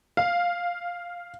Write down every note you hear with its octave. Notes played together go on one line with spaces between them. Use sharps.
F5